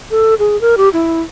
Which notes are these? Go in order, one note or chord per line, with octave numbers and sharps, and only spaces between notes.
A4
G#4
A#4
G4
E4